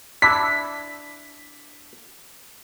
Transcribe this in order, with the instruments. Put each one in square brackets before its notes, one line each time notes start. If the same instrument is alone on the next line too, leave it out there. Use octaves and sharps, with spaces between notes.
[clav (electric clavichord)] D4 E4 [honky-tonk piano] B6